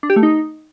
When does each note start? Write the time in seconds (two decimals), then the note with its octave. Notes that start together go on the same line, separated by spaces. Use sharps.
0.03 D4
0.10 G4
0.16 A3
0.23 D#4